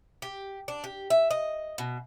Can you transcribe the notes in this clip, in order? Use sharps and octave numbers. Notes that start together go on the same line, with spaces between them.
G4
D4
G4
E5
D#5
B2